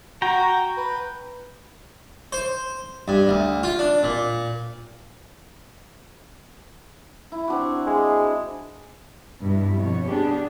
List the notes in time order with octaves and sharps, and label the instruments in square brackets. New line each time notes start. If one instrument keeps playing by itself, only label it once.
[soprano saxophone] F#4 [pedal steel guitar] G5 A#5
[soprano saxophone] B4
[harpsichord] C5
G2
D2
F4
D4
A#2
[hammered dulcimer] E4
C4 D4 F#4
[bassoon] G#3
[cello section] G2 B2 G3 E4
F2 B2 C#5
B3 D4 G4 G#4